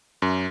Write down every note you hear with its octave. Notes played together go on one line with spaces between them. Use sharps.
F#2